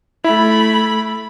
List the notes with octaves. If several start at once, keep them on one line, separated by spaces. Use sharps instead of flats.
A3 E4 B5